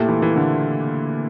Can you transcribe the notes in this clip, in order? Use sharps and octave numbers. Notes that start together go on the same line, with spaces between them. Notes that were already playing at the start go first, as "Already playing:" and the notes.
Already playing: A#2 A3 E4 G4
E3
E3
D3